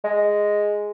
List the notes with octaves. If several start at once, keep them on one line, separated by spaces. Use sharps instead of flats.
G#3